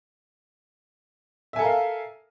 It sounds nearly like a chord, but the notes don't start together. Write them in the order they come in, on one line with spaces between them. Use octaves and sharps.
E5 G#5 A4 A#4 F5